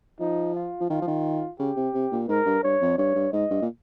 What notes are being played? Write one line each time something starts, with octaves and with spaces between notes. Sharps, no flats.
F3 D#4
F4
F3
D#3 F4
F3
D#3
C#3 G4
C3
C3
A#2
G#2 A#4
G2
G2 C#5
F2
G2 C#5
G2
G#2 D#5
G2
A#2